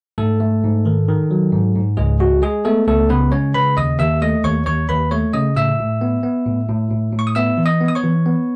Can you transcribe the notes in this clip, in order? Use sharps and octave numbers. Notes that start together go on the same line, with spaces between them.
G#2 A3 A4
A3
G#2
D#3
D#3
F#3
G#2
G#2
C#2 G#3 G#4
G#3 F#4
G#3 G#4
A3 B3 A4
C#2 A3 A4
C#3 B3 B4
G#3 C#4 C#5
C#3 B4 B5
D#2 D#5 D#6
D#2 E5 E6
A3 D#5 D#6
D#2 C#5 C#6
D#2 C#5 C#6
D#2 B4 B5
A3 C#5 C#6
C#3 D#5 D#6
A2 E5 E6
A2
B3
B3
A2
A2
A2
A2
C#6
D#6
B3 E5 E6
E3
D#5 D#6
B3
D#6
C#5 C#6
E3
B3